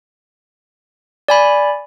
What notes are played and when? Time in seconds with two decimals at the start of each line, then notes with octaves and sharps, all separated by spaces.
1.28 D5 G#5 B5